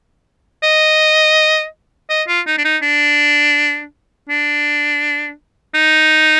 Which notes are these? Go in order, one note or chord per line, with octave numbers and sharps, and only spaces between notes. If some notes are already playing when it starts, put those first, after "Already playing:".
D#5
D#5
F4
D#4
D4
D#4
D4
D4
D#4